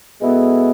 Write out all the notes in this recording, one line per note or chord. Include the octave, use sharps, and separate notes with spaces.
B2 G#3 B3 E4 A4